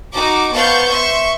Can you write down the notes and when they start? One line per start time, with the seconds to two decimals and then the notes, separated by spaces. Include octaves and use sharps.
0.11 D#4 F#4 D6
0.52 B3 C5 F5 A5 C#6 G6
0.88 E5 C6 C#6